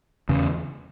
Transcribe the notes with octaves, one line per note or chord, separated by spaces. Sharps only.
E2 C#3